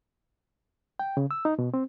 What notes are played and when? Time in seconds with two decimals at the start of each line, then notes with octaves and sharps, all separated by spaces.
0.99 G5
1.17 C#3
1.31 E6
1.45 D#4
1.59 B2
1.74 C4